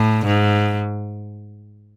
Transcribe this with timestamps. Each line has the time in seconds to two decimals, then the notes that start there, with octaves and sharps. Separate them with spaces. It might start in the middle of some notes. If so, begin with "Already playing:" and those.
Already playing: A2
0.26 G#2